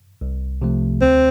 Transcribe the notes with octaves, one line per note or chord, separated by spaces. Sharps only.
C2
C3 F3 A3
D2 C4